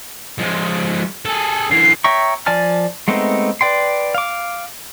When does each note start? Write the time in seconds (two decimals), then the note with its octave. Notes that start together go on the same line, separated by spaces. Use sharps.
0.38 F3 G#3
1.26 G#4 A4
1.71 D3 E3 C7
2.04 C#5 E5 G5 A#5 C#6
2.46 F3 D5 G#5 A5 F6
3.08 G#3 A3 B3 C4 D#4
3.61 B4 D5 G5 C6
4.15 F5 D6